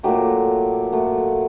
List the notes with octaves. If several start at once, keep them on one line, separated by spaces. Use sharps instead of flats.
A#2 F#3 A3 G4
A#2 F#3 A3